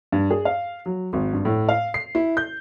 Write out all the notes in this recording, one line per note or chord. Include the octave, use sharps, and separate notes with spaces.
G2
G#4
F5
F#3
G#1
G2
A2
F5
C7
E4
G6